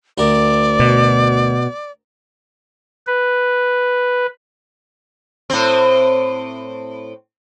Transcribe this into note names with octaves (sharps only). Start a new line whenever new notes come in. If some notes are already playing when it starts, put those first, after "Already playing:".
D2 A#4 D5
B2
B4
A2 C4